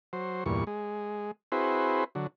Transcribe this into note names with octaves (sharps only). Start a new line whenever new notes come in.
F#3 C5
E2 G2 A#2 C#6
G#3
C4 E4 F#4 G#4 B4 C5
D3 F#3